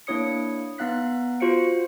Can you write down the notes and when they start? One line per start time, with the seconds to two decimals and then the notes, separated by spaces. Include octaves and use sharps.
0.07 A#3 D4 E4 C#5 D#6 C#7
0.78 B3 D#4 F5 F#6 B6
1.40 F4 F#4 C5 F5 C#7 D7